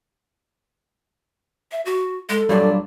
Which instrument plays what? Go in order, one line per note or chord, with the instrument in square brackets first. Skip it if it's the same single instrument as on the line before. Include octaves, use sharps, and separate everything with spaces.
[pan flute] E5
F#4
[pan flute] G#3 [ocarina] A4
[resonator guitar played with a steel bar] G2 A#2 D4 [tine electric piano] F#3 G3 [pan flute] D5